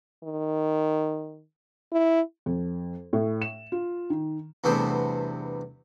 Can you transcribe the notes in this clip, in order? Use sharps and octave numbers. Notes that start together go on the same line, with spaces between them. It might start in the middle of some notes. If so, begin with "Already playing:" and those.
D#3
E4
F2
A2
E7
F4
D#3
E2 G2 C3 A3 B3 C5